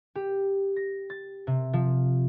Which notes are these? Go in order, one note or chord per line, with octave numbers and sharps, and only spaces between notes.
G4
A#6
A6
C3
F3